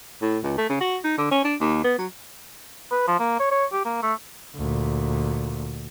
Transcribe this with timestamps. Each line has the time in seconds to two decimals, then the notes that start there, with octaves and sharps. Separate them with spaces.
0.22 A2
0.44 C#2
0.58 A3
0.70 C#3
0.81 F#4
1.04 D#4
1.18 D3
1.31 C#4
1.44 D4
1.60 D#2
1.84 B3
1.99 F#3
2.91 B4
3.07 F3
3.19 A#3
3.40 C#5
3.51 C#5
3.73 G4
3.85 A#3
4.03 A3
4.56 D2 A#2